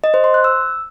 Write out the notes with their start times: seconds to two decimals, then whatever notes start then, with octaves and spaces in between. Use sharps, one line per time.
0.04 D#5
0.14 C5
0.24 C6
0.34 F#6
0.44 E6